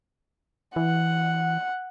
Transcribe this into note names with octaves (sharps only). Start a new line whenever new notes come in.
E3 F#5